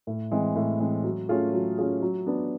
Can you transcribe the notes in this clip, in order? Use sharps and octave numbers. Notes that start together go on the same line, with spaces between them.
A2
E3 G#3 C4
A2
E3 G#3 C4
F#3
A3 C#4 F4 G#4
F#3
A3 C#4 F4 G#4
F#3
B3 D4